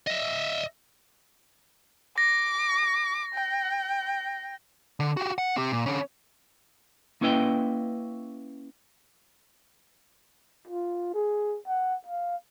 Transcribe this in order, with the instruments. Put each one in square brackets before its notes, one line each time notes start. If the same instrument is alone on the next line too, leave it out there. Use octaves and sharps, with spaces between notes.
[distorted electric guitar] D#5 E5
[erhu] D6 [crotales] A#6
[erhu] G5
[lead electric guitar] D3
F#4 G4
F#5
C4 G4
A#2
D3 C#4
[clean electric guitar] A#3 C#4 E4 B4 D#5 G5
[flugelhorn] F4
G#4
F#5
F5